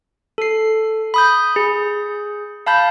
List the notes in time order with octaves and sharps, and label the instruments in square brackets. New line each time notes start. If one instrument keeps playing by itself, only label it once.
[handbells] A4 C7
B5 D#6 G6
G#4
F5 A5 B5 G6